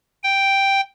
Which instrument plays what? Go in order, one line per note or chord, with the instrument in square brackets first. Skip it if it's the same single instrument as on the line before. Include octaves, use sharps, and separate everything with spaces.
[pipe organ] G5